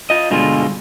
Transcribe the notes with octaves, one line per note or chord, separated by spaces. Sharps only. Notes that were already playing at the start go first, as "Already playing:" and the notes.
F4 D#5
G2 B2 D3 G#3 F4